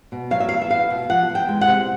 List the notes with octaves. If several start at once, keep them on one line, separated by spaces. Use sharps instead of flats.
B2
F#3 F5
E5
E2 F5
E5
B3 F5
B2
F3 F#5
E2
G5
G#3
F#5
C3